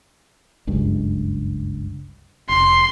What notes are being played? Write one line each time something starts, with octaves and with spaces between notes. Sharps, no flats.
F#1 C#2 G2
F1 C6